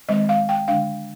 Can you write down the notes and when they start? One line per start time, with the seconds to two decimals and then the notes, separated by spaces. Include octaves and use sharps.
0.09 D#3 G#3 C4 D#5
0.29 F5
0.49 G5
0.68 D3 G#3 D4 F5